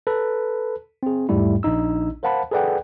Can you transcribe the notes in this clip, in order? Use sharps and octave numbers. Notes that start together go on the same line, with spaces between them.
A4 B4
C4 G#4
E2 G#2 G3 A3 E4
A#1 D4 D#4 E6
A#4 C5 F5 F#5 A5 B5
G#4 A4 B4 D5 F#5 G5